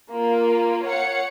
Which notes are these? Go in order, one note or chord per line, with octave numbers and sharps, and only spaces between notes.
A#3 F4
C#5 F5 F#5 C#7